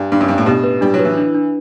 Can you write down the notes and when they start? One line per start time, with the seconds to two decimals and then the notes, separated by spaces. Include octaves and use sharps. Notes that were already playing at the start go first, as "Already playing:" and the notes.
Already playing: G2 D4 G4
0.12 G2 D4
0.21 F#2
0.28 G2 D4
0.38 A2
0.46 B2 G4
0.64 B4
0.81 G3 D4
0.94 F#3
0.99 B4
1.05 E3
1.17 D4
1.35 D4